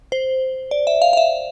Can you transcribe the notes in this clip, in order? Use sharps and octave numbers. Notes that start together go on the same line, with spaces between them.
C5
D5
E5
F5
F5
E5